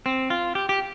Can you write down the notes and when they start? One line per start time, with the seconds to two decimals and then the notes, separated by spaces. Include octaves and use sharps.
0.06 C4
0.30 F4
0.55 G4
0.69 G4